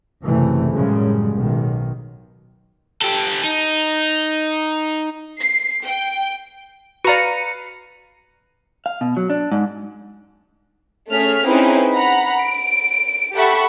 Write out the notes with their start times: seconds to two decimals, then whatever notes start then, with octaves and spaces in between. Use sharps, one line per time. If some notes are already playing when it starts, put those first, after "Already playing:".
0.24 F#1 C3 E3 A3
0.73 F#2 A2 C#3 G3 G#3
1.32 B1 D#3
3.02 G4 A4
3.44 D#4
5.40 C7
5.85 G5
7.04 F#4 B4 D5 F5 A#5 C#7 D#7
8.86 F5
9.01 B2
9.17 F#3
9.30 D4
9.52 G#2
11.10 A3 C#4 G#4 F6 B6
11.47 C4 C#4 D#4 E4 G#4 B4
11.96 F#5 A#5 B5
12.44 D7
13.34 G4 A4 E5 F#5 B5 C#6